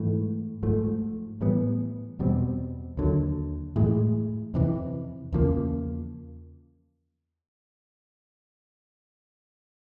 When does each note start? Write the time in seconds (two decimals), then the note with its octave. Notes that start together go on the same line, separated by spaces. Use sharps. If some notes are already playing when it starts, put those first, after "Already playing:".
Already playing: G#2 E3 A3
0.63 G#2 F3 A3
1.41 A2 E3 G3 B3
2.19 E2 B2 G3 C4
2.97 D#2 D3 F#3
3.76 A2 E3 G#3
4.54 F2 C3 E3
5.33 E2 C#3 F3 A#3